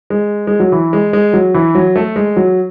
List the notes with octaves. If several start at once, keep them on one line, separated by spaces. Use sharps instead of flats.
G#3
G#3
F#3
E3
G#3
G#3
F#3
E3
F#3
A3
G#3
F#3